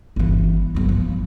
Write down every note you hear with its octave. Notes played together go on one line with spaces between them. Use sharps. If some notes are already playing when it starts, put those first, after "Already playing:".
G1 E3
G1 F#3
F3